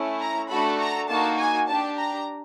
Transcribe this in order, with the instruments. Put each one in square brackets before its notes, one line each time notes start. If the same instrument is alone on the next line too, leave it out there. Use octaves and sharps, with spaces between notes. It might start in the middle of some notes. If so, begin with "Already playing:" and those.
Already playing: [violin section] A3 C#4 E4
A#5
A3 D4 F#4 A4 B5
A#5
A#3 D#4 F#4 A5
G#5
D4 G4 A5
A#5